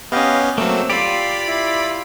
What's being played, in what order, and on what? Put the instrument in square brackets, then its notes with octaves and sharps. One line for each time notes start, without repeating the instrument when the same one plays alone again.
[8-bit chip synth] B3 C#4 [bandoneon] G4 D#5 F5
[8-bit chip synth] F#3 A3 [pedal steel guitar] A#3 C4 [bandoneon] E6
[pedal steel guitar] F4 G4 [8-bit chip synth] D5 B5
[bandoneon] E4